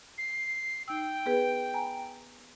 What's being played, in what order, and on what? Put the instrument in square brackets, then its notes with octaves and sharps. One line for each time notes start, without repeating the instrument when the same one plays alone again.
[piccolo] C7
[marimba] D#4 E6 [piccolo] G5
[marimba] B3 G#4 B4
G#5 A#5 B5